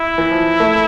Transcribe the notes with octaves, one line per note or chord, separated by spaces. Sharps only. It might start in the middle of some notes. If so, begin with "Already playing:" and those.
Already playing: E4
E3
F3
A3